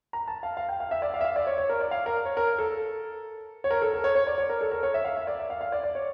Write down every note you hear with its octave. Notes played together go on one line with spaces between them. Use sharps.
A#5
A5
F5
F5
G5
F5
E5
D5
F5
E5
F5
D5
C#5
C#5
A#4
D5
F5
A#4
C#5
A#4
A4
C#5
A#4
A4
A#4
C#5
C#5
D5
C#5
A#4
A4
A#4
C#5
E5
F5
E5
D5
E5
F5
F5
D5
D5
C#5